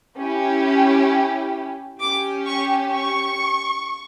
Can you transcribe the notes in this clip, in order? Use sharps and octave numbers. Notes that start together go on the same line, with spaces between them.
C#4 E4 G4
C#4 G4 D6
C#6
C#6